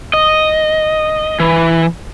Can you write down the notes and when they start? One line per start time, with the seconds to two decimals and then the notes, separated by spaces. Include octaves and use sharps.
0.14 D#5
1.40 E3